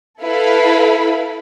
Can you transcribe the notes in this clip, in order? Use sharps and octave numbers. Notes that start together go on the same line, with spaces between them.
E4 A4 B4 F5 B5